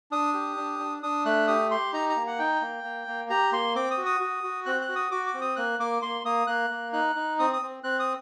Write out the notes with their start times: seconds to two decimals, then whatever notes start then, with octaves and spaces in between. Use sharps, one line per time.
0.11 D4 D#6
0.34 G4
0.57 D4
0.79 D4
1.03 D4 D#6
1.25 A3 F#6
1.48 G4 D#6
1.71 G4 C6
1.93 D#4 A#5
2.09 A#5
2.16 A#3
2.27 F#5
2.39 D#4 G5
2.61 A#3
2.84 A#3
3.07 A#3
3.30 G4 A#5
3.52 A#3 C6
3.75 C4 D6
3.91 D#6
3.97 F#4
4.06 D#6
4.20 F#4
4.43 F#4
4.66 C4 F#6
4.81 F#6
4.89 F#4
4.96 D#6
5.11 F#4 D6
5.27 D6
5.34 C4
5.41 D#6
5.56 A#3 F#6
5.79 A#3 D6
6.02 A#3 C6
6.25 A#3 D#6
6.47 A#3 F#6
6.70 A#3
6.93 D#4 F#6
7.15 D#4
7.39 C4 D#6
7.53 D#6
7.62 C4
7.83 C4 F#6
7.99 D#6